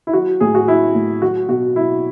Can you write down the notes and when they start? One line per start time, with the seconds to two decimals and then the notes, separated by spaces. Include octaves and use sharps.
0.07 E4
0.13 F#3 F#4
0.40 A2 G#4
0.55 F#4
0.67 F#3 E4
0.95 A2
1.22 F#3 F#4
1.48 B2 F#4
1.76 F#3 E4